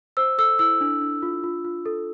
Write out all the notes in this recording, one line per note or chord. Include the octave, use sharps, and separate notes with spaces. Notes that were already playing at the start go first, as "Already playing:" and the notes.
C5 E6
A4 E6
E4 E6
D4
D4
F4
F4
F4
A4